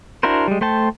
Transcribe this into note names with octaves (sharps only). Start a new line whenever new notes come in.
D4 E4 F#4 A#4 C5
G3 G#3
A3 C5 G5 A5